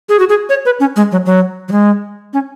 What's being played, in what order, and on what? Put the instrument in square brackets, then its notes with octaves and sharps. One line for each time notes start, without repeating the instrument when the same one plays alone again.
[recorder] G#4
F#4
G#4
C#5
B4
C#4
G#3
F#3
F#3
F#3
G#3
C#4